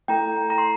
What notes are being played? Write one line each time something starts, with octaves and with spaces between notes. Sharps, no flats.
A3 E4 A4 G5 A#5
A#5
C6